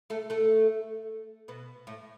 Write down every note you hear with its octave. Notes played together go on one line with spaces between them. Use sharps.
A3 A4
A3 A4
B2 B3
A2 A3